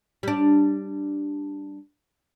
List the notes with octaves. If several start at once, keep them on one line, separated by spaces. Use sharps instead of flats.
G3 D4